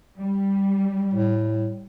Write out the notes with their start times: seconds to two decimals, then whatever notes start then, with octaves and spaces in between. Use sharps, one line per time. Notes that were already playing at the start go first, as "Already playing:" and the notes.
0.17 G3
1.14 A2